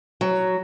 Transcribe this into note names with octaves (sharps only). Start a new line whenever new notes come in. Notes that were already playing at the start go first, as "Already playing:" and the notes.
F#3